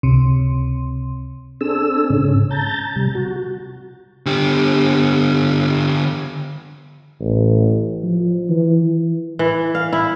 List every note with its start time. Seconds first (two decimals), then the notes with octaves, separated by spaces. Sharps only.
0.03 C#2 C3
1.61 C4 D4 G#4 A4 E6
2.10 G#2 C#3 C#4
2.50 A5 A#5 G6 A6
2.96 C3 G3
3.15 F#4
4.26 D3 G4
7.20 A1
8.04 F3
8.50 E3
9.39 E3
9.75 F5
9.93 E4